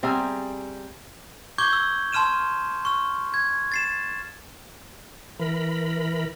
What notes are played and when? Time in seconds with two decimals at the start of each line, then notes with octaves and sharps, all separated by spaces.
0.03 G3 C4 G#4 E5 G#5 A#5
1.58 C#6 D6 G6 G#6 G7
1.73 E6
2.13 A5 C6 F6 D#7 E7
2.85 C#6 F6
3.34 G#6
3.72 A6 C7 E7
5.39 E3 A#4 B5